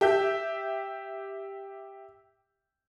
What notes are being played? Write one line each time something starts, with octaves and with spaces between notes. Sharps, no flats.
G4 E5 G6